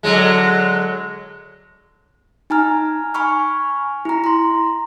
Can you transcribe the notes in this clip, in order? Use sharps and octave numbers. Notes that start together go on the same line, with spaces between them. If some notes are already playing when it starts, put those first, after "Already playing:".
D3 F#3 G#3
D#4 G#5 A#5 F6
G#5 B5 C#6 F6
E4 A#5
A#5 C6